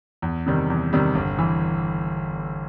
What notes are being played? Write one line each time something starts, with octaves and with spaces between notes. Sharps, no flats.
E2
C3 D#3 G3
E2
C3 D#3 G3
G1
E3